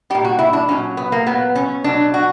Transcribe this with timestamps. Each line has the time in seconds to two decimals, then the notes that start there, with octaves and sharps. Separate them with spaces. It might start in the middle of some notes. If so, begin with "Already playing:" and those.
0.10 A#2 G3 G4
0.25 F#4
0.39 E4
0.53 D4
0.68 A#2 F#3 C#4
0.97 B3
1.12 A#3
1.26 A#2 F#3 B3
1.56 C#4
1.84 B2 F#3 D4
2.14 F#4